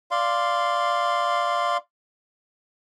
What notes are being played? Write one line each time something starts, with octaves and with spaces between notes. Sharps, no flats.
D5 F5 C6